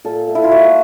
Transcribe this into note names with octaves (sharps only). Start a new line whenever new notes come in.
A#2 A4
A3
E4
F4
A#2 F#4